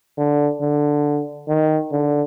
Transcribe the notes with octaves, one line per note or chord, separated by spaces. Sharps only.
D3
D3
D#3
D3